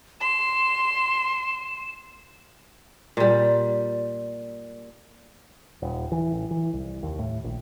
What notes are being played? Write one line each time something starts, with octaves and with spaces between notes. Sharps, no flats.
C6 E7
A#2 G3
D#1
E3
A1
E3
C2
D#2
A2
A#1